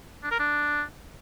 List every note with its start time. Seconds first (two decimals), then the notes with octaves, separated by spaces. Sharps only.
0.23 D4
0.32 A#4
0.40 D4